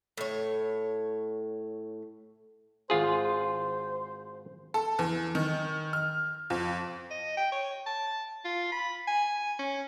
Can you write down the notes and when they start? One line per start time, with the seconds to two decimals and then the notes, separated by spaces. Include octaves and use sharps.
0.17 A2 C#5
2.90 G#1 F4 G#4 C5
4.74 A4
4.99 E2
5.35 D#3
5.93 F6
6.50 F2
7.10 D#5
7.37 G5
7.52 C#5
7.86 A5
8.45 F4
8.72 B5
9.08 G#5
9.59 C#4